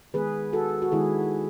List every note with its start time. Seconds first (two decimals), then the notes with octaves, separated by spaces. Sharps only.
0.14 D#3 G#3 B3 G#4 B4
0.53 F#4 A4
0.82 F#4
0.92 D#3 G#3 B3 E4 G#4